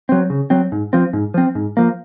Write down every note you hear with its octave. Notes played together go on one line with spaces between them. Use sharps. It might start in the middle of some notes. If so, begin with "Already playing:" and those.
F#3 C4
C#3
F#3 C4
G#2
F3 C4
G#2
F3 C4
G#2
F3 A#3